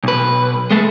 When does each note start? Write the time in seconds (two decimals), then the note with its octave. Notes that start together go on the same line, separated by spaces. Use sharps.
0.04 B1 B4
0.71 G#3 A3